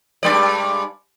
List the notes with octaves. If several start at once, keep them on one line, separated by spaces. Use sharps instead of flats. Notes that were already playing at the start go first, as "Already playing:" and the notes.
G2 G#3 D5